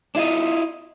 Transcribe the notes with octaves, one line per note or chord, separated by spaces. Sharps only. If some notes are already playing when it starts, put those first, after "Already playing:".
D4 E4 F4 D#5